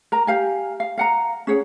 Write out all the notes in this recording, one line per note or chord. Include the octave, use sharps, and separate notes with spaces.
A#4 A#5
G4 F5 G#5
F5
F5 F#5 A#5
C#4 G#4 C#5 F#5